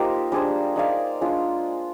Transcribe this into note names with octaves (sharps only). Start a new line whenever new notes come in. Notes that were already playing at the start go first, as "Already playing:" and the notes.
Already playing: A#3 D#4 F4 G4 A#4 C5
G3 D4 G#4 C5
D#4 G#4 D5 F5
G#3 D4 F4